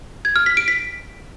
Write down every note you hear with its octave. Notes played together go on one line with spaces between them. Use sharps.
G#6
F6
B6
D7
B6